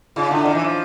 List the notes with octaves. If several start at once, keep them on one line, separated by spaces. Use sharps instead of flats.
C#3 D#4 F4
D3 D4 E4
D#3 C#4 D#4
E3
F3